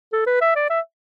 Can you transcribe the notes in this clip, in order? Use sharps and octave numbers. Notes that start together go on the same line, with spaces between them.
A4
B4
E5
D5
E5